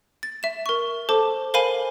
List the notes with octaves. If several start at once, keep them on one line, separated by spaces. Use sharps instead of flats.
A6
E5 E7
A#4 C#6
A4 C5 A5 D6
A#4 C5 F5 G#5 B5 D#7